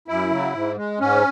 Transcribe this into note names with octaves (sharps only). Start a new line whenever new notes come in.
F#2 E4
C#3 F#3
G#2
G#3
G#2 C#4